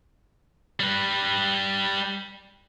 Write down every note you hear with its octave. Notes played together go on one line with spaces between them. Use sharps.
G3 B4